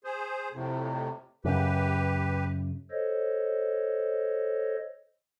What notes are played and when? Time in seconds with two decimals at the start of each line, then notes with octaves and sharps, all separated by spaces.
0.04 G#4 C5
0.53 F2 A2 C3
1.45 F#2 C#3 G4 B4
2.91 A4 C5 C#5 D#5